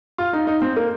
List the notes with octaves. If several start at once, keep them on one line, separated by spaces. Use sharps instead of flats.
F4
D#4
D#4
C4
A#3